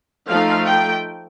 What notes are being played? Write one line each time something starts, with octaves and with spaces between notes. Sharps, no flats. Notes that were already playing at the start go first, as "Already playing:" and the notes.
F3 A3 D#4 F5
G5